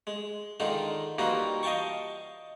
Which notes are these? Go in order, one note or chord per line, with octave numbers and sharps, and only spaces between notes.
G#3
D3 D#3 G#3 D#4 F4
E3 G3 A#3 D#4 F4 F#4
D#5 F5 G5 A5 C#6